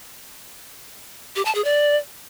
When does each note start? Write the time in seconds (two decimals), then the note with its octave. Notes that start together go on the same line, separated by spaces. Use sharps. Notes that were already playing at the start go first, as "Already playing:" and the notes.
1.36 G4
1.45 A5
1.55 G#4
1.64 D5